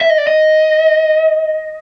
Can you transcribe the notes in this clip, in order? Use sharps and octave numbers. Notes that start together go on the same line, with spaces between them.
E5
D#5
D5
D#5